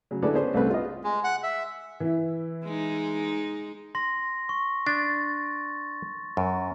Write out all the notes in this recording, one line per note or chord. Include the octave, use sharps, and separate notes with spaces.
C#3 F#3
D3 G#3 E4 A4 B4 D5
B3 C#4 D4 G#4 C5
C2 A3 C4 B4
F4 D#5
G#3
F#5
E5
E3 E4
G#3 D#4
C6 A#6
C#6
D4 A6
F#2